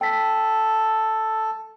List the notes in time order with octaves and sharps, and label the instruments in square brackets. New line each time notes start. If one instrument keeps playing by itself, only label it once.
[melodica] A4 [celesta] G5 B6